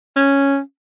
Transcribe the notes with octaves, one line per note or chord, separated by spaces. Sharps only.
C#4